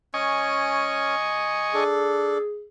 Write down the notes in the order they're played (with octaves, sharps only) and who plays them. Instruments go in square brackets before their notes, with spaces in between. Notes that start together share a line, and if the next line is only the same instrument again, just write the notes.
[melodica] C#4 [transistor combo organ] D#5 G#5 C#6
[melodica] D4 A4 [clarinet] G#4